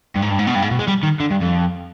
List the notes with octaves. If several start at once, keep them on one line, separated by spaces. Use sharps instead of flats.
G2
G#2
G2
G#2
B2
G2
G#2
B2
G#3
G3
D#3
D3
G2
F2